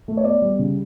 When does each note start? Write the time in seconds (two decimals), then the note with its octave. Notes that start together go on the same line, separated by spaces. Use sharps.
0.08 A3
0.17 C#5
0.24 B3 D5
0.42 G3
0.59 C#3